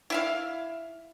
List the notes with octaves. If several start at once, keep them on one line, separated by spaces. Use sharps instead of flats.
E4 E5 F5